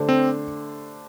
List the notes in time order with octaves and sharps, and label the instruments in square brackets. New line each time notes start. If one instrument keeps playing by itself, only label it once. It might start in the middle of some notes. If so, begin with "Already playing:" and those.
Already playing: [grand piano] D3 A3 D4 G4 C5
[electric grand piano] C4